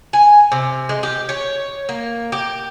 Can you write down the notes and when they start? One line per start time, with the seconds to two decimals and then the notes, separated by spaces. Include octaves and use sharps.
0.13 G#5
0.52 C3
0.89 G#3
1.03 G4
1.29 C#5
1.89 A#3
2.32 G4